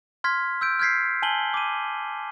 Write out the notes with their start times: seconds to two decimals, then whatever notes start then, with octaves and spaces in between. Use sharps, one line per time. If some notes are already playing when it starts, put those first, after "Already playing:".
0.24 C6 F6 G#6 B6
0.61 E6 G6 D7
0.79 F6 G6 G#6 B6 C7
1.22 G#5 A5 F#7 G7
1.54 D6 D#7